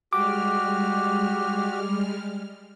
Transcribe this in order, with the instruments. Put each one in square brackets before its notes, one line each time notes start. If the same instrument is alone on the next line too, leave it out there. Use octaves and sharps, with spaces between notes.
[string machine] G3 G#3 F6 [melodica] F#4 G4 [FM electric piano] D6